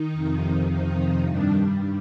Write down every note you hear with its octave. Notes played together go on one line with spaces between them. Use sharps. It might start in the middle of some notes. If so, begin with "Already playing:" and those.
Already playing: D#3 D#4
F2 C3 F3
D#3 D#4
G2 D#3 G3 D4